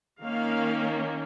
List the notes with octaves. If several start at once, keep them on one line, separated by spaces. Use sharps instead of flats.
D#3 A#3 C#4 F5